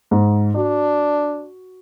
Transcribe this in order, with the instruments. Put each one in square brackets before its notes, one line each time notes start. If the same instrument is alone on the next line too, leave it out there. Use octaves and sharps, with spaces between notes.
[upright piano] G#2
[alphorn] D4 [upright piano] F#4